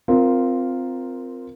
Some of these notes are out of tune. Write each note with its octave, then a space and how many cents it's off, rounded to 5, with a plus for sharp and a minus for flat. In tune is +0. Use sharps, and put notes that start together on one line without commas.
C4 -10 F4 +0 A#4 +0